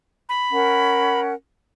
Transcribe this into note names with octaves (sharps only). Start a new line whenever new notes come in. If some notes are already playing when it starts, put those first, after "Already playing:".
B5
C#4 A#4 F#5